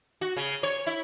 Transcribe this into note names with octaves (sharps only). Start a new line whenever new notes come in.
F#4
C#3
C#5
E4